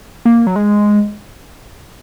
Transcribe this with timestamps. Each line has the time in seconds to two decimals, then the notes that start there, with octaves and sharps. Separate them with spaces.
0.25 A#3
0.47 F#3
0.56 G#3